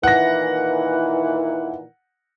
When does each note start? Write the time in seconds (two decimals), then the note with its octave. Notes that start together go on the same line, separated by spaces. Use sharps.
0.03 A#2 D#3 E3 F#5 A#6